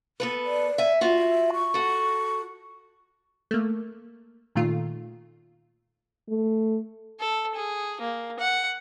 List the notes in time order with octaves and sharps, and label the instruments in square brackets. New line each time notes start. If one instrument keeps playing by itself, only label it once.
[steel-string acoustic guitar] B3 A4 B4
[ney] D5
[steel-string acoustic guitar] E5 G#5
[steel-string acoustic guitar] F4 F#4 [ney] E5
[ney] C#6
[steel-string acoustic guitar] F#4 A4
[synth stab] A3 A#3
A#2 D#3 A3 F4
[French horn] A3
[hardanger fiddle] A4
G#4
A#3
F#5